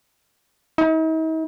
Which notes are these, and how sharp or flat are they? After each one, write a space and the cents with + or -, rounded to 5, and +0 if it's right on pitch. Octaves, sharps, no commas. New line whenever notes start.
D#4 +45